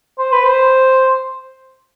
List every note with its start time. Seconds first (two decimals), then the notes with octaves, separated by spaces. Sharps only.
0.19 C5
0.32 B4
0.45 C5